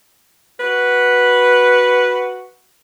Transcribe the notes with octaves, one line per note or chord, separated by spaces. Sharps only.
F#4 B4